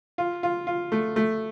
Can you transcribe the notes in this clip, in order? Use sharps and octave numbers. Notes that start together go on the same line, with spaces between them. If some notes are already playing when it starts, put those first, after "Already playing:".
F4
F4
F4
A3
A3